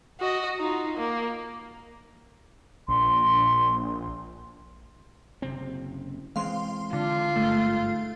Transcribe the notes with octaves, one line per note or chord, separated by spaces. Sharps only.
F#4 D#5
D#4 F4
A#3
A#1 C6
F#1 C3 C4
E3 G#3 C4 F5 C6
D3 F4
G1 G#2 A3